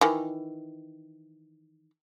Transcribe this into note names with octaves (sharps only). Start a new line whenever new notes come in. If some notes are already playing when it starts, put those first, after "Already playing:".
D#3 E3